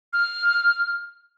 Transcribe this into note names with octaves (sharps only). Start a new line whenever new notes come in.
F6